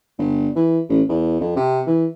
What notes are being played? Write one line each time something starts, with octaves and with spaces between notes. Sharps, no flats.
G1
E3
A1
E2
F2
C3
E3